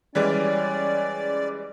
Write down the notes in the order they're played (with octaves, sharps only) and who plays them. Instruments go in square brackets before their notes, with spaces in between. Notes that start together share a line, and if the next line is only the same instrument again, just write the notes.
[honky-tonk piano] E3 G3 G#3 [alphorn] C#4 [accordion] D5